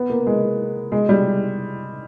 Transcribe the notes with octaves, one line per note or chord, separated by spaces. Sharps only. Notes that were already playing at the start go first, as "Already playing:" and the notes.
Already playing: B3
A#3
G#3
G#3
G3